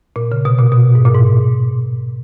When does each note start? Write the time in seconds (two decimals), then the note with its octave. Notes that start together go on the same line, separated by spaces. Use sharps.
0.16 A#2
0.32 C#3
0.45 B2
0.58 A#2
0.72 B2
0.95 G#2
1.05 A#2
1.15 G#2